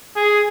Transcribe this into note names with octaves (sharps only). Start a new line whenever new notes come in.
G#4